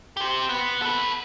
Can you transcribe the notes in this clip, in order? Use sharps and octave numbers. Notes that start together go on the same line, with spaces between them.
G4 C5
B3
A4 B4